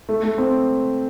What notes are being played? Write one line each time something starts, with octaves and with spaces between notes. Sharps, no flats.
A3
A3
C4